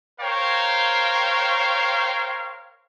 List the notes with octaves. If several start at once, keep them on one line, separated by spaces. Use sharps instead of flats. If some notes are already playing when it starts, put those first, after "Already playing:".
A#4 C5 C#5 F5 G5